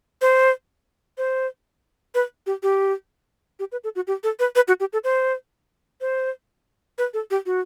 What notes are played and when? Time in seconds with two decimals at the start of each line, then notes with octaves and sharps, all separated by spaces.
0.21 C5
1.18 C5
2.15 B4
2.47 G4
2.63 G4
3.59 G4
3.72 B4
3.84 A4
3.96 F#4
4.07 G4
4.23 A4
4.39 B4
4.56 B4
4.68 F#4
4.80 G4
4.93 A4
5.04 C5
6.01 C5
6.98 B4
7.14 A4
7.31 G4
7.46 F#4